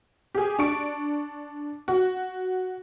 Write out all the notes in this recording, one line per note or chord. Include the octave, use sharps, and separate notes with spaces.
G4 G#4
D4 C#6 D7
F#4